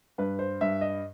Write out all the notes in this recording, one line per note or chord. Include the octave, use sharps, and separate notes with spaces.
G2 B4
C5
G2 E5
D#5